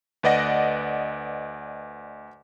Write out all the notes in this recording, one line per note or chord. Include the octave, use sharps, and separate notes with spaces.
D2 B4 D5 D#5 F#5 A#6